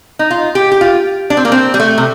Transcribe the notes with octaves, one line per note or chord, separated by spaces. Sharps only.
D#4
F4
G4
G4
F4
D4
C4
A#3
C4
G3
A3
C3